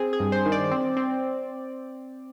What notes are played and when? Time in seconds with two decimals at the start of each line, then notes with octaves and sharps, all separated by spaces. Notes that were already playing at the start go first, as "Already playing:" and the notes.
Already playing: C4 G#4
0.13 G#4
0.20 G2
0.32 C5
0.46 D#3
0.52 D5
0.71 C4
0.97 C4